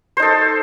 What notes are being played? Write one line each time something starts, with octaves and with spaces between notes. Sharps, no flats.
D#4 A4 C5